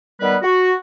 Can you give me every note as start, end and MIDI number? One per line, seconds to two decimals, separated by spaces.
0.20 0.35 51
0.20 0.35 55
0.20 0.35 59
0.20 0.35 71
0.42 0.72 66